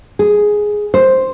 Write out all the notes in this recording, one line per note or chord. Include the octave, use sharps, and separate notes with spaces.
G#4
C5